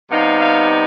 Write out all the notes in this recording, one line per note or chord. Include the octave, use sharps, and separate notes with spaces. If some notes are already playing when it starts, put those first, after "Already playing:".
C3 G3 B3 D#4 F5
F5